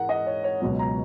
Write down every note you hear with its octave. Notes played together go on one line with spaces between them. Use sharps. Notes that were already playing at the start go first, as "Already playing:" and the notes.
Already playing: G#2 E3 G#3 A#4 F#5
D#5
C#5
C#5
C#2 B2 F#3 C#5
A#5